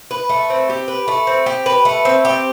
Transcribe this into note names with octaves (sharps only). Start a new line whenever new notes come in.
B4
A3
C4
G4
B4
A3
C4
G4
B4
A3
C4
G4